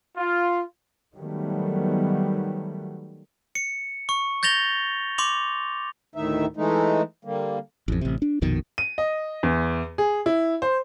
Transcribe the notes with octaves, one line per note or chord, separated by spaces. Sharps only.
F4
D#3 F#3 G3 A3 B3
C#7
C#6
G6 A6 A#6 F7 G7
C6 D6 F7
D2 A2 D#3 D#4 E5
E3 G#3 A3 D#4
D3 G3 A#3
A1 F2
A1 C3
D4
A#1 F2 B2 D#3
D#7
D#5
E2
G#4
E4
C5